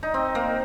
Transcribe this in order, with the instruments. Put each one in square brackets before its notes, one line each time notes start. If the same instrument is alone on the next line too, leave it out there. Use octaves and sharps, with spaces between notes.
[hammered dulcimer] D#4
C4
A#3